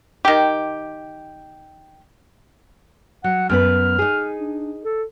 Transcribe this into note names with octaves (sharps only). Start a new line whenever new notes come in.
D#3 G4
F#3 F#5
F#2 B3 B4 F6
D#4 G#4
D4
A4